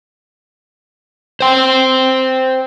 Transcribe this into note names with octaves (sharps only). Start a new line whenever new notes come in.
C5 G5